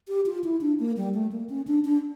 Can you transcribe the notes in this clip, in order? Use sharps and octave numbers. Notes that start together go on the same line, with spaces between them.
G4
F4
E4
D4
A#3
G3
A3
A#3
C#4
D4
D4